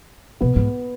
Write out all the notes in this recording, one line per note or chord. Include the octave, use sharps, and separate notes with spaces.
B2 B3
G#2